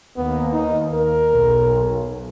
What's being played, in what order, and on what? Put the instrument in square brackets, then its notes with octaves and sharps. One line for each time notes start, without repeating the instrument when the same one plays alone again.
[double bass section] D#2 A#3 [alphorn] B3
[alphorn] D#4
A#4
[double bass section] B1